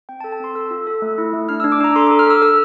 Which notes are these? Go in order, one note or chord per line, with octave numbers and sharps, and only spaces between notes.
C4 G5
A5
A4
A5
C4 C6
A4 E6
F4
A4
A3
E4
A3
D4 F6
E6
D4
D6
D4 A#5
A4 C6
D6
A4
F6
A4 E6
A4 E6